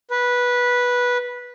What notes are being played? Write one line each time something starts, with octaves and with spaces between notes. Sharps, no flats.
B4